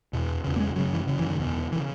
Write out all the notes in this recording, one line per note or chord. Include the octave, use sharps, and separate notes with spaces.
E2 B2
E2 C#3
A#3
G#3
F#2 C#3 F#3
E3
F#2 C#3
E3
D#3
E2 B2
E3
C#3